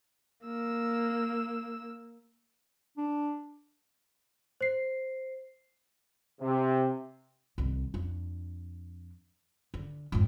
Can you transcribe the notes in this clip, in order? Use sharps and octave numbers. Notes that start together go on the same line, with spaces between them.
A#3 E6
D4
C5 C7
C3
C2 D#3
F2 D4
D3
F2 G#2